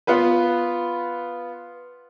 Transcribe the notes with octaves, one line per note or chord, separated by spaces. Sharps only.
B3 F4 B4